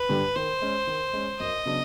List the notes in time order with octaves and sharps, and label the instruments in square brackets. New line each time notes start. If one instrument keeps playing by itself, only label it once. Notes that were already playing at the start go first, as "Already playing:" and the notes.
Already playing: [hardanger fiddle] B4
[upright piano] G2 D3 G3
[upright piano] D#3 [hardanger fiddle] C5
[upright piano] G#3 C#4
D#3
G#3 C#4
[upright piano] F#2 [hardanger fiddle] D#5
[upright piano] C#3 F#3 B3 D4